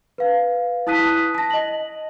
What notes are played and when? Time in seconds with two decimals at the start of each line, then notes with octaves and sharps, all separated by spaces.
0.18 B4 F5
0.87 E4 A5 D#6 F#6 B6 D#7
1.35 A5 A#6
1.50 D#5 F#7